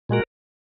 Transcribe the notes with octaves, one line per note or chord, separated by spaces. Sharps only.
A#2 G#3 F#4 A#4